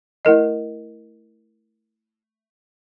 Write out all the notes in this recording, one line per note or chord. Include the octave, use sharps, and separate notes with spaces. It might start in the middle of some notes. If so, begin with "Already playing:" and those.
A3 E4 A#4 D#5